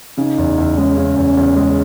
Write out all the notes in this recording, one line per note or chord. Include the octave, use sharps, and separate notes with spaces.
C#3 D#4
E2
E2
G#3 C#4
C#3
E2
E2
G#3